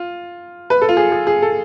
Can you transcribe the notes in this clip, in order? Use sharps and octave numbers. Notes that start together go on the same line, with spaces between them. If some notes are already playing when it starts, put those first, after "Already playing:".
Already playing: F4
B4
A4
F4
G#4
G#4
G#4
A4